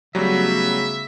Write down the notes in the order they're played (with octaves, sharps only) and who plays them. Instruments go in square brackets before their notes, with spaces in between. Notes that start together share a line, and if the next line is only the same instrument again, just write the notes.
[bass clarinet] C#3 [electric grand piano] F#3 G3 F#4 [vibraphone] A3 B3 C#4 [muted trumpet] E5